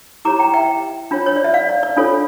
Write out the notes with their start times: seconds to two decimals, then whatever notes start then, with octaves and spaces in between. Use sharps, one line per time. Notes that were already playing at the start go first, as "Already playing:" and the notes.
0.25 E4 G4 C#5 A#5 D6
0.39 G5 A#5
0.54 E5 G5
1.11 D4 F4 C#5
1.26 C#5
1.36 D5
1.44 E5
1.54 D5 F5
1.69 D5
1.83 D5
1.97 D4 F4 A4 C#5